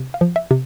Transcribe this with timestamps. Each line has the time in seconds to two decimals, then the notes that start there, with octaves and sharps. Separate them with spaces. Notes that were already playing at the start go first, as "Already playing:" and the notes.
Already playing: C3
0.14 F5
0.21 F3
0.36 E5
0.51 C3